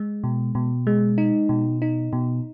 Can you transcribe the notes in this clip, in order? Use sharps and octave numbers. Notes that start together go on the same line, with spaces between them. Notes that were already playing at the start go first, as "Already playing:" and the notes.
Already playing: G#3
B2
B2
G#3
D#4
B2
D#4
B2